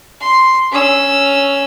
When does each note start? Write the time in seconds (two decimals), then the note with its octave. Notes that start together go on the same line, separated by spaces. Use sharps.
0.21 C6
0.72 C#4 E6